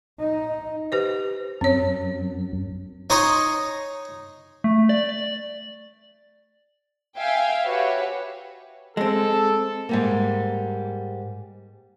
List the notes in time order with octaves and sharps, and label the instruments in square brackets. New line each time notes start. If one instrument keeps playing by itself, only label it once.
[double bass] D#4
[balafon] G4 B4 C5
[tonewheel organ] F#2 [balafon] C4 C#5
[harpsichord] D#4 C#5 G#5 A#5 C6 D#6
[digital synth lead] A3
D5
D5
[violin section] E5 F5 G5 G#5
F#4 G4 B4 C#5 E5
[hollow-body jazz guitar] G#3 C4 [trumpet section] A4
[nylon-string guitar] G#2 G3 A#3